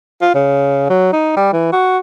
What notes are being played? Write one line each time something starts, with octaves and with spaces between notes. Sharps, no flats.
F4
C#3
F#3
D#4
G3
E3
F#4